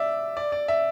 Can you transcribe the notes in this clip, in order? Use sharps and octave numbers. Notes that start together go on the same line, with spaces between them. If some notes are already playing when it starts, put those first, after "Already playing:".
Already playing: D5 E5
D5
D5
E5